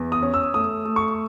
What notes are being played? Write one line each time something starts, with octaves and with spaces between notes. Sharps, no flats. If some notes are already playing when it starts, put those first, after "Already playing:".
Already playing: E2
D#6
C#4
E6
A3 D#6
A3
C#6